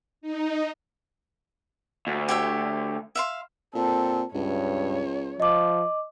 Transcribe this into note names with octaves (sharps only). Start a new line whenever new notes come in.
D#4
D2
G4 C#5 E5
E5 F5 C6
A#2 C4 A4
C#2 G2 C#5
F3 D#5 D6